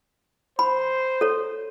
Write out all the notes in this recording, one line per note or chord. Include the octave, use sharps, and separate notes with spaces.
C5 B5
A4 C#5